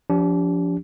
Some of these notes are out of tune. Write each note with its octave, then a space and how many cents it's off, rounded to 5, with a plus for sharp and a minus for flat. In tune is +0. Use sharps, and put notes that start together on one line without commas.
F3 +0 D4 -35 G4 +0